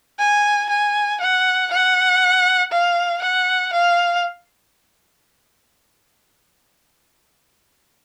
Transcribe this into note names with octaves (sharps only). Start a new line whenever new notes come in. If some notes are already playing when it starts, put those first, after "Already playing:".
G#5
G#5
F#5
F#5
F5
F#5
F5